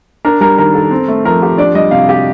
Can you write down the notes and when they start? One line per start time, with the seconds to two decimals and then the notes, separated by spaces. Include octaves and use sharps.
0.25 D4 A#4
0.41 G3 A#4
0.58 D#3 A#4
0.74 A4
0.91 C4
1.08 A3
1.25 F3 A#4
1.42 G4
1.58 D4 D5
1.74 G3 D#5
1.91 C3 F5
2.09 G4